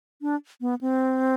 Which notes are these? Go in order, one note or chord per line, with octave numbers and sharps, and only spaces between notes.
D4
B3
C4